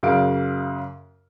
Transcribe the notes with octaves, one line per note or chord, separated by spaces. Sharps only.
F#2 C#3 F5 D7